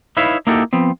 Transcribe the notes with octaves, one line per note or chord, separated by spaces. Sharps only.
D#4 E4 B4 C#5 E5 F5
A#3 D#4 E4 F#4 G4 A4
F3 B3 C4